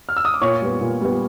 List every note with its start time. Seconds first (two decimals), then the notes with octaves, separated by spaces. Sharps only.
0.09 F6
0.16 E6
0.25 D#6
0.34 D6
0.41 A#2 C#5 C#6
0.62 G3 B3
0.81 A#2
1.01 G3 B3